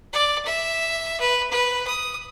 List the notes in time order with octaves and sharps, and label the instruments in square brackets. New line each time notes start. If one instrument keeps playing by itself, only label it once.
[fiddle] D5
E5
B4
B4
D#6